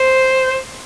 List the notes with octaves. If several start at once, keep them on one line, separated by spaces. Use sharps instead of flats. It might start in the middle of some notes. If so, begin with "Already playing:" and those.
Already playing: C5